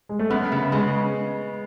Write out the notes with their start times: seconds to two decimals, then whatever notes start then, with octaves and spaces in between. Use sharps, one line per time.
0.09 G#3
0.19 A3
0.30 F#2 B3
0.52 C#3
0.72 C#3 G#3